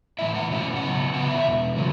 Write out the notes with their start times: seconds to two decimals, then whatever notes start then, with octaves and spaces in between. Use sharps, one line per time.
0.19 A2 E3 B3 E4 E5
0.35 F#5
0.50 B2 A3 C#4 E4 F#5
0.76 F#5
0.82 C#3 F#3 B3
1.14 C#3 E3 B3 E4 F#5
1.30 E5
1.46 E2 B2
1.76 C#3 F#3 A3